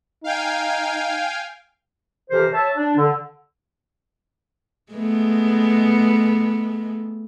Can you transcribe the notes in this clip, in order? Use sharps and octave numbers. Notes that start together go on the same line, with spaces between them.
D#4 F5 G5 G#5
F2 C3 E3 G4 A#4 C5
C#5 E5 A5
D4
D3
G#3 A3 B3